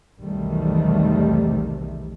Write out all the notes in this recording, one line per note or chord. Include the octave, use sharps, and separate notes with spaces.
B1 E2 C3 D#3 G3 A3